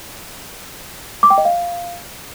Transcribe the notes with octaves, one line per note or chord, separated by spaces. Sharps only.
D6
G5
D#5
F5